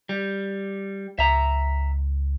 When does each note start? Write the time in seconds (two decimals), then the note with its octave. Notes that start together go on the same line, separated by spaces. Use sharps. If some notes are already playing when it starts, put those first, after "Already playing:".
0.09 G3
1.19 C#2 E5 A#5